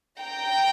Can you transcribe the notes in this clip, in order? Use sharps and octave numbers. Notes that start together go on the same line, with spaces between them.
G5 A#5